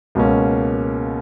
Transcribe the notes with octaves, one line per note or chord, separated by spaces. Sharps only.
C#2 B2 A#3 C#4